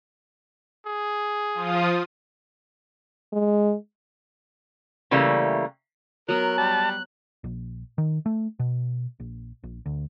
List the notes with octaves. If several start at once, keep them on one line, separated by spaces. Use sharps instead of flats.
G#4
F3 F4 D#6
G#3
C#3 E3 G3 A3 A#3
F#3 B3 A#4 F#6
G3 A5
A#1
D#3
A3
B2
A#1
A#1
D2